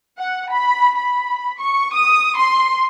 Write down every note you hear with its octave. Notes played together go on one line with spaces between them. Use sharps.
F#5
B5
B5
C#6
D#6
C6